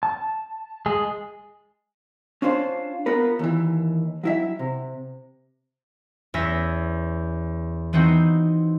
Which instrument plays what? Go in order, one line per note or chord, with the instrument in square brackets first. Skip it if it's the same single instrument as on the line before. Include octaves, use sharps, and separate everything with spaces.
[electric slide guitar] A5
[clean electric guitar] G#3 G#4
[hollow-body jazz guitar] C#4 D4 F4 C5
B3 F4 A#4 B4
D#2 E3
F#3 E4 E5
C3
[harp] E2 C#4 E6 A#6 B6
E3 B3 C4 D#4 F#4